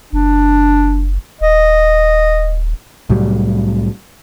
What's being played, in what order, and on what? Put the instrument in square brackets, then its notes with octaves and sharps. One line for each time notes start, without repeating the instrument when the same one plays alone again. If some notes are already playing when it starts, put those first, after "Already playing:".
[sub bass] F#1 [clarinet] D4
[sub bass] D#1 [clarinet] D#5
[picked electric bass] C2 A2 F#3 G3